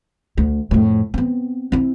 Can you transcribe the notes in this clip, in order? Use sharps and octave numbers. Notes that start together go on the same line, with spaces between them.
D2
F2 A2
B3 C4
C4 E4